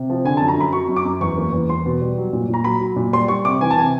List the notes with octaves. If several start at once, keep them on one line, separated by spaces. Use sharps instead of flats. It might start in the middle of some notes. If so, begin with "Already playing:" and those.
Already playing: C3
F3
D3 G#5
A5
F#2
A#5
F#2 B5
F#3 C#6
F#2
D6
F#2
E2 C#6
A#3
E2
E2 C6
B2
G3
F#3
A#2
A#2
A#5
F#3 B5
F#3
A#2
G3 C6
G3 C#6
C3 D6
E3 G#5
A5
C3 G#5